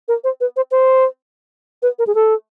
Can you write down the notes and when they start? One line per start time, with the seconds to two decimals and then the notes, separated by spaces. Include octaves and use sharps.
0.08 A#4
0.24 C5
0.41 B4
0.56 C5
0.71 C5
1.82 B4
1.99 A#4
2.07 G#4
2.15 A4